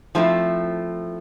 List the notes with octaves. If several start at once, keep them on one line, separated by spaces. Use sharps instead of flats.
F3 A3 C4 E4